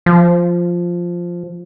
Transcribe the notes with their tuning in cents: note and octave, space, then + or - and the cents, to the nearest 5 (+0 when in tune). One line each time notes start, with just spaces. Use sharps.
F3 +0